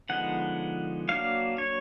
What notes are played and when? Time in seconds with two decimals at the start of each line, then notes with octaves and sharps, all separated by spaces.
0.09 D3 F3 G#3 B3 D#4 F#5
1.09 F#3 A#3 D4 F5
1.58 C#5